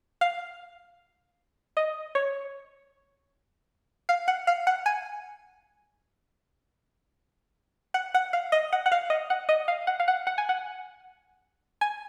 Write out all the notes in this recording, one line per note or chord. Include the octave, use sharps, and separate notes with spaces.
F5
D#5
C#5
F5
F#5
F5
F#5
G#5
F#5
F#5
F5
D#5
F#5
F#5
F5
D#5
F#5
D#5
F5
F#5
F5
F#5
F#5
G#5
F#5
G#5